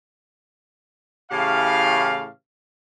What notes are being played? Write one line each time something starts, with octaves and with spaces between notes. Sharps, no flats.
A2 C#3 E3 G4 F5